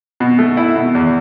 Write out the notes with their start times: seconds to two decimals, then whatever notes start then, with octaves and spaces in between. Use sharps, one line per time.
0.20 B2
0.39 A3
0.57 E4
0.75 B2
0.95 E2